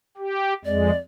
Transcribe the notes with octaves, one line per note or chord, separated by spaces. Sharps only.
G4
F2 G#3 D5